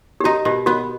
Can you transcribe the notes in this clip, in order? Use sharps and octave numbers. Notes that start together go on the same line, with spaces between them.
G4
D#4 F#4
B2 G4
B3 F#4